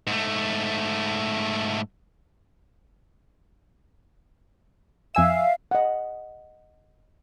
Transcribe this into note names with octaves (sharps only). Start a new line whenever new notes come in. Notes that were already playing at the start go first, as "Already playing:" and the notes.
G#2 A3
F2 E5 F5 G#5 E6
D#5 F#5